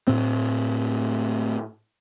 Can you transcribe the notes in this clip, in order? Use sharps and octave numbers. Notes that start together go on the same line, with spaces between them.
A2 C4